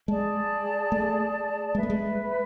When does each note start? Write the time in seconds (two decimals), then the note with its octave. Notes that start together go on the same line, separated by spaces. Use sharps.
0.08 G#3 G#4 D5 A5
0.92 A3
1.75 G#3 B4 E5 B5
1.83 A3
1.90 G#3